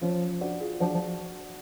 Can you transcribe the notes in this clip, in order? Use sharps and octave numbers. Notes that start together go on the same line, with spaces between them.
F3 C#4 F4
D4 F#4
F4 G#4
F3 D4 F#4
F3